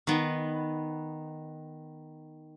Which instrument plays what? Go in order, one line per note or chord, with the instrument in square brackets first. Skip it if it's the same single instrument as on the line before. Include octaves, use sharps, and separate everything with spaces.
[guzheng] D#3 B3